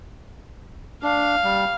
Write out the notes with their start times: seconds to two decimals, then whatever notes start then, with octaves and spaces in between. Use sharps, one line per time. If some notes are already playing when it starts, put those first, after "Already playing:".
1.03 D4 F5
1.44 G3